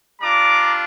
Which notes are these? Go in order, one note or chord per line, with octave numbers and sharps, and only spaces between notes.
G3 D4 F4 A#5 D6